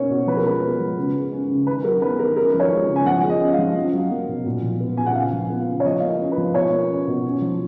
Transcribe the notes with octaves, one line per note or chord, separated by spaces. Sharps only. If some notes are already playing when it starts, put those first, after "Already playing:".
Already playing: B2 A#3 C#4 C#5
B2
F3 B4
A#4
G#3 B4
B3
F3
C#3
G#3
C#4
C#3
D#3 B4
F#3 A#4
B3 B4
D#3 A#4
C#4 A#4
F3
C#5
G#3
C#3
G#5
F3 F#5
G#3
D#5
C#4
F5
F3
C#4
F#3
A#3
B2
A#2
F3
B3
A#2 G#5
F#5
C#3 F5
F3
B3
C#3
C#5
F3 D#5
A#3 F5
D#5
C#4
B4
F3
B2 C#5
A#3
C#4
B2
C#4
F3